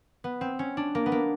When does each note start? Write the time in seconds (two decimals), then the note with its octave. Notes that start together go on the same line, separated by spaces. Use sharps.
0.24 B3
0.41 C4
0.59 C#4
0.77 D4
0.95 A#3
1.06 B3
1.12 A#3